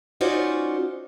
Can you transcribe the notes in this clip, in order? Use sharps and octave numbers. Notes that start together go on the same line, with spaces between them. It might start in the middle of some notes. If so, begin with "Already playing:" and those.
C#4 D#4 F4 F#4 C5 D5